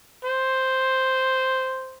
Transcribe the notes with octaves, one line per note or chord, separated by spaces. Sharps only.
C5